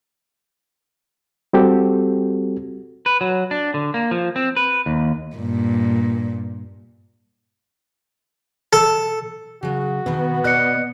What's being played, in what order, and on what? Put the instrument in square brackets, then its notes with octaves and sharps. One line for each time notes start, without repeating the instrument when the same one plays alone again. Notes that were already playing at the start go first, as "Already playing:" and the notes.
[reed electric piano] G3 C4 F#4 G4 A4
[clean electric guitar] B4
F#3
D4
D3
A#3
F3
C4
B4
D#2
[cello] G2 A#2
[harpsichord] A4
[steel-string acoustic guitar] C#3 F#3 [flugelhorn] F#4
[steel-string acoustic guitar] B2 D#3 [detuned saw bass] B3
[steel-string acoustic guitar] B2 D5 D#5 [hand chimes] F#6 C#7